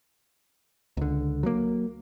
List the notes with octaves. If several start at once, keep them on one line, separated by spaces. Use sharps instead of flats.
C#2 D3
F#3 A#3